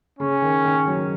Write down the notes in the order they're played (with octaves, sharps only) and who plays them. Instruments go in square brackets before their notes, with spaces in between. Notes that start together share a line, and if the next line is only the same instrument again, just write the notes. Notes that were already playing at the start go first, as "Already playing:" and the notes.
[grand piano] C#3 [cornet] C#4
[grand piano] D#3
D#3
F#3